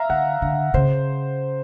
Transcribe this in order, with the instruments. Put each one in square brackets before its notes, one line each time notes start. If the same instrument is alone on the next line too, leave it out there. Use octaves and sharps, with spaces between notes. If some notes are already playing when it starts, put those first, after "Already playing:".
Already playing: [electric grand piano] E5 F5 A#5
[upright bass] D3 [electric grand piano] F#5
[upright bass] D3
[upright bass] C#3 [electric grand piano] C5